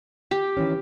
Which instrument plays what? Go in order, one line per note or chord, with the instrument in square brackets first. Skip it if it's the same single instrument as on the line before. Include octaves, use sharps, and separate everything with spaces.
[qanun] G4
[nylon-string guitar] D#3 E3 C#4